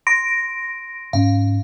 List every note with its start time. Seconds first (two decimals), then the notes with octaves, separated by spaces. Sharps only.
0.07 C6 A#6 D7
1.13 G#2 C#4 F5